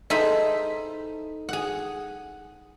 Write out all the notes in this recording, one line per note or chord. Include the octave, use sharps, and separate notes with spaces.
D#4 E4 G#4 A4 C5 E5
G#4 F#5